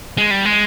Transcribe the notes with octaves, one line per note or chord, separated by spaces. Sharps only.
G#3
G3
G#3